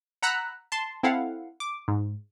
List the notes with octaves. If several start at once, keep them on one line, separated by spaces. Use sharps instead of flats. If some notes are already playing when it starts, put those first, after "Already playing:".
F#5 A#5 B5 E6 F#6
A5 C6
C4 E4 A4 F5 F#5
D6
G#2